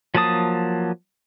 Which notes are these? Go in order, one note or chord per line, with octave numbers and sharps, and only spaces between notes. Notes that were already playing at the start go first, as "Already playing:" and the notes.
F3 F#3 A#3 A5 D#6